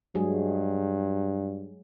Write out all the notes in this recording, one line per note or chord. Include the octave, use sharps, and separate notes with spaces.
G2 F#3 G#3 G#4